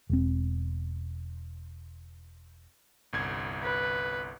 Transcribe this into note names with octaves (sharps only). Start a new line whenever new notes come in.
E1 C4
G1 C2 G#6
B4